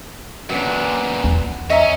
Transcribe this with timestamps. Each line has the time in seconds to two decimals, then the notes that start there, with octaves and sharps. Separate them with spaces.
0.50 F#2 A#2 F#3 B3 D4
1.24 E2
1.70 C#4 D#5 E5 A#5